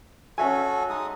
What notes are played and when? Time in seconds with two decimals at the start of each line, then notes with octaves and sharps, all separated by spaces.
0.38 C#4 F#4 A4 E5 G#5
0.90 G#3 D#4 D#6